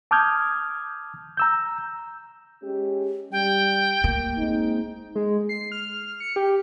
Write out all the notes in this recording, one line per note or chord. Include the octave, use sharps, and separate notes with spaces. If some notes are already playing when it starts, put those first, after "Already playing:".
A5 D6 D#6 F6 G6 G#6
A#5 E6 G6
G#3 C#4 G4
G3 G5
A#3
G#3 C4 D#4
G#3
C7
F6
C#7
G4